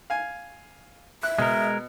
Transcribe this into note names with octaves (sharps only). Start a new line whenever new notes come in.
F5 G#5
E5 F#6
B2 G#3 A#4